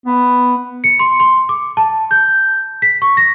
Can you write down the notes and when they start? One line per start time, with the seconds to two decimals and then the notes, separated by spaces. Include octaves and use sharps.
0.06 B3
0.84 C#7
0.99 C6
1.20 C6
1.49 D6
1.77 A5
2.11 G6
2.82 B6
3.02 C#6
3.17 A#6